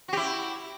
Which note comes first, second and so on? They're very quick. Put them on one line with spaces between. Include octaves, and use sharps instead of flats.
F#4 G4 E4